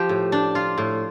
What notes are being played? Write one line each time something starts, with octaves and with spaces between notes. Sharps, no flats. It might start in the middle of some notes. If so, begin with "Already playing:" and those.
Already playing: F3 G4
A2
D4
F4
A2